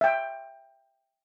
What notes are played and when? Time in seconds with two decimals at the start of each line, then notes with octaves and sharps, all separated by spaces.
0.01 E5 G5